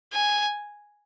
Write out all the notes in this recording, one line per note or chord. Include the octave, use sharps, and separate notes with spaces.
G#5